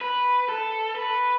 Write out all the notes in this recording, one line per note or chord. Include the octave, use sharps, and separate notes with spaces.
B4
A4
B4